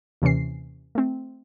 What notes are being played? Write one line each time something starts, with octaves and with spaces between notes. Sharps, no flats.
D#2 C3 E3 C#4 C7
A3 C4